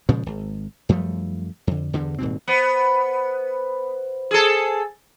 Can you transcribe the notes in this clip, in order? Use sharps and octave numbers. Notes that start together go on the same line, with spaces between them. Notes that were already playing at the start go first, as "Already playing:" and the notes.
A#2 C#3 F3 G#3
G#1
F#2 F3 G3 A3
F2 D3
E2 G2 D3
D#1 G#2 B2 C4
B3 C5
G#4 A4